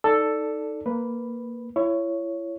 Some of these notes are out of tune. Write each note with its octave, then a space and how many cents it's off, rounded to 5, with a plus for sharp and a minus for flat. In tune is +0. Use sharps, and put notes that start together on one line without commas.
D#4 +0 A4 +5 D5 +0
A#3 +0 B4 +0
E4 +35 C#5 +5